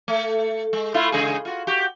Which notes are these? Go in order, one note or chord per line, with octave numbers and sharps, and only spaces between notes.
A3
G#3
A3 E4 F4
C#3 G#3 G#4
F4 F#4
F#4 G4